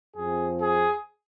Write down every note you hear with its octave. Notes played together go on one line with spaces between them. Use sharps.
F2 F3 C4 G#4
G#4